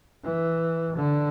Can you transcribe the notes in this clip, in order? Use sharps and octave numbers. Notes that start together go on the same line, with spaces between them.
E3
D3